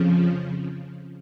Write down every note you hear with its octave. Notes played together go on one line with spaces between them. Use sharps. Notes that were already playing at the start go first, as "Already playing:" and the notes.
Already playing: F2 C#3 F3